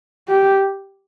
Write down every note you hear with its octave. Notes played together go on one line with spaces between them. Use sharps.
G4